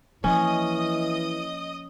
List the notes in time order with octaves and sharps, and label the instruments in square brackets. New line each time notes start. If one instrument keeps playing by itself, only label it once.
[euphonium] E3 [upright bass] F3 A#3 [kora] C#4 [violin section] D#5 D#6